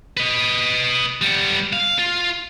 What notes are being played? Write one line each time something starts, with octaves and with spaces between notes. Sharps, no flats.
B4 D#5
G3 B3
F5
F4